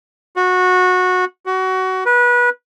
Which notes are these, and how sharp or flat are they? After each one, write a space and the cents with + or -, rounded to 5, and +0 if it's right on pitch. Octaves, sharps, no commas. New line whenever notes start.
F#4 -20
F#4 +20
B4 -25